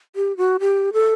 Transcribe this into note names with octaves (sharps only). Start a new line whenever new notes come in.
G4
F#4
G4
A4